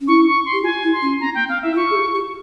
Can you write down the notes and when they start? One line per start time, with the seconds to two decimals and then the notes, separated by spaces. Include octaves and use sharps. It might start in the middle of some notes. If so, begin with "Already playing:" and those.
0.01 C#4
0.08 E4 C#6
0.27 C#6
0.46 C6
0.53 G4
0.64 F4 G#5
0.83 E4
0.93 C6
1.02 C#4
1.20 C4 A#5
1.35 A#3 G5
1.48 C4 F5
1.62 E4 E5
1.72 E4
1.76 F4 C#6
1.90 G#4
1.95 G4
2.14 G4